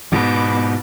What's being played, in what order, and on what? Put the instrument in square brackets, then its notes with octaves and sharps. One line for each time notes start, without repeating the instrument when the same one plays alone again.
[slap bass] G#2 B2 [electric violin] B3 D6